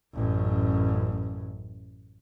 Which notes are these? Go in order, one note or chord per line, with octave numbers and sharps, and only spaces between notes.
A1 F#2